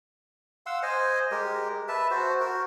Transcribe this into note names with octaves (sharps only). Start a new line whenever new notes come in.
F5 F#5 C6 E6
C5 D#5 G#5
G#3 G4 A#4
B4 E5 A5
F#4 C5
F#4 A#4